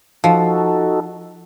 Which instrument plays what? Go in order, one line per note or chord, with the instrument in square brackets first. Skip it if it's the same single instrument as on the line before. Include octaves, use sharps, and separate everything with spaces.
[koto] F3 [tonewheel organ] D#4 F#4 A4